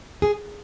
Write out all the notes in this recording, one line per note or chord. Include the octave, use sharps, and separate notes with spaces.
G#4